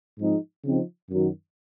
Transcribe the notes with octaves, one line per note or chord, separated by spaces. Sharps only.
G#2 F3 G#3 C4 D#4
C#3 F3 C4 D#4
F#2 D#3 F#3